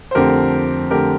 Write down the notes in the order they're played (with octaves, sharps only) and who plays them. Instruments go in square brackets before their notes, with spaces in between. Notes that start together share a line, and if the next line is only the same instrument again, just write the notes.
[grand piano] C5
F2 D3 A3 C4 G4 A#4
D3 A3 C4 G4 A#4